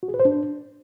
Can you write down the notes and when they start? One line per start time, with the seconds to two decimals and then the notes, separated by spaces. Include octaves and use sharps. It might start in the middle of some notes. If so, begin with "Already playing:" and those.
0.03 F#4
0.08 G#4
0.14 B4
0.20 C5
0.25 D4